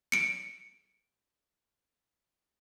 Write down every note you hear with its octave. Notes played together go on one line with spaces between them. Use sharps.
C#7 D7